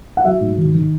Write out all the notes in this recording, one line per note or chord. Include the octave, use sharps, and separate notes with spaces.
F#5
F#3 E5
G#2
D#3
D#3